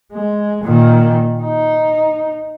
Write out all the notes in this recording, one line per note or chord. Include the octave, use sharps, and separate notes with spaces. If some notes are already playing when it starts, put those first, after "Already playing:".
G#3
A#2 D#3
D#4